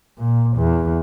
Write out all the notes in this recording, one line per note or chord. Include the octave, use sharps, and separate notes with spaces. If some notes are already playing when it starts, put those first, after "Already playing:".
A#2
E2